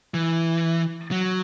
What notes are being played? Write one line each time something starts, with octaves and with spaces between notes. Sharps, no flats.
E3
F#3